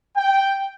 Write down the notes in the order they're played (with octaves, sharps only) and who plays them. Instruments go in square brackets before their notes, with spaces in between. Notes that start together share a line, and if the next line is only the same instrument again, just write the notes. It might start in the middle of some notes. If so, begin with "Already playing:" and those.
[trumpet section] G5